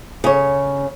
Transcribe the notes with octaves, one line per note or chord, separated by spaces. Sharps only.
C#3 C#5